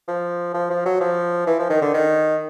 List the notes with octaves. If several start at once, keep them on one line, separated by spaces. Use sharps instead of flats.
F3
F3
F3
F#3
F3
E3
F3
D#3
D3
D#3